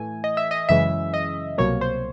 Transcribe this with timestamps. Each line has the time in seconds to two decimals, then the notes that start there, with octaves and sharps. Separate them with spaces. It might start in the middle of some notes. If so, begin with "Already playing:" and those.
Already playing: A2 E3 A3 G#5
0.24 D#5
0.37 E5
0.51 D#5
0.69 F#2 C#3 E3 G#3 E5
1.14 D#5
1.58 C2 B2 F#3 A#3 C#5
1.81 C5